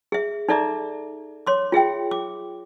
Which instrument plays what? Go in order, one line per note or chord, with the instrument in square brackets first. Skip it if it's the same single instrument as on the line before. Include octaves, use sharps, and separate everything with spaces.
[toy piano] G#4 E5
D#4 A4 D5 E5 A#5 D6
C#5 C6 D6
F4 G#4 E5 G5
D6